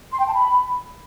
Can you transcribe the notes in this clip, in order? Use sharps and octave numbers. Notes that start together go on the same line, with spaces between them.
C6
G5
A5
B5